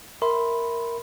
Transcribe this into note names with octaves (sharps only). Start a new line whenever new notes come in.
A#4 E5 B5 C6